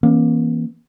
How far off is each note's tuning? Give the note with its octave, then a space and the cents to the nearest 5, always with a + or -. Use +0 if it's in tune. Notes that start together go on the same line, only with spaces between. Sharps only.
E3 +0 A#3 +30 C#4 -30